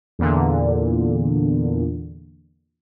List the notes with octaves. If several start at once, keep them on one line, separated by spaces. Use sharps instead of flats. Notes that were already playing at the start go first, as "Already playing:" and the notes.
E2 A#2 D3